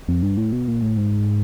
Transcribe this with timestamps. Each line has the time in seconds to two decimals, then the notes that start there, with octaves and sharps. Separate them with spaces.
0.08 F2
0.23 G2
0.37 A2
0.52 B2
0.68 A#2
0.82 A2
0.97 G#2